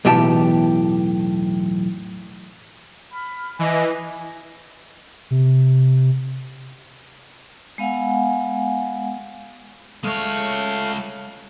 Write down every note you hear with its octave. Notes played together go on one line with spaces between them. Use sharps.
B1 E2 A2 E3 G4 A5
B5 F6
E3 D#5 G#5 D6
C3
G#3 B3 F5 F#5 G#5
G#3 A3 C#5 F5